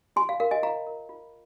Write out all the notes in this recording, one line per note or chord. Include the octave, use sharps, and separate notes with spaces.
F4 G#5 C6
F5
A#4 F5
D#5 G#5
F4 F5 A#5
A#4
F4